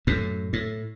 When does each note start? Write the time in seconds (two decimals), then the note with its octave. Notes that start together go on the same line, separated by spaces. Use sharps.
0.07 F#2 A2
0.53 A2